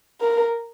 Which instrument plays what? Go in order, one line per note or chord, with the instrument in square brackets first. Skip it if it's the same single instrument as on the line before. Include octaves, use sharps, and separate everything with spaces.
[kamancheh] A#4